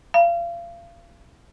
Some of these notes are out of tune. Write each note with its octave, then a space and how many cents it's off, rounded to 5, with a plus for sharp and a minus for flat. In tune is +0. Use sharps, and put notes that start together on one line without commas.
F5 -35